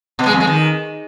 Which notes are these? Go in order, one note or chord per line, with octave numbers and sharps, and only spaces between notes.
B2
G#3
F2
G#3
D#3